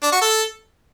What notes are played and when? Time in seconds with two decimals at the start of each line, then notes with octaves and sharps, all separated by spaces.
0.03 D4
0.12 F#4
0.21 A4